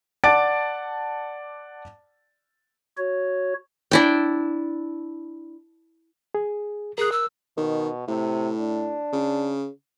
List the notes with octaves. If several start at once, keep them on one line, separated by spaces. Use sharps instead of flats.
D5 F#5 A5 D6 A6 D7
F#4 C#5
D4 E4 G5
G#4
G#4 A#4 F#6
E6
B2 D#3
A2 C3
D4
C#3